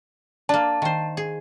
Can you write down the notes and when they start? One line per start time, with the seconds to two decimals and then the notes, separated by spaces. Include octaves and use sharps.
0.49 A#3 D4 A5
0.82 D#3 C5
1.17 G#4